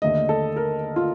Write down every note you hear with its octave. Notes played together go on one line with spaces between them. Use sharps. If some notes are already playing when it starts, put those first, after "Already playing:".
D#2 D3 A3 D#5
A4
A#4
F4